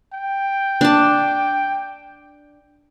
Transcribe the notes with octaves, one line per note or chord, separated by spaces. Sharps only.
G5
D4 A5